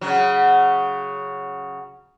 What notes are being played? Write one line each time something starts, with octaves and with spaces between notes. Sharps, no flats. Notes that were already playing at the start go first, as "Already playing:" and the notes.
C#3 F#3